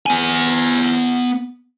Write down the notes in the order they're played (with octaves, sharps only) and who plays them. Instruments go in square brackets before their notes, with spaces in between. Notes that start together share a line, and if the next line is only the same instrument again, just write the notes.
[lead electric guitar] B3 G#5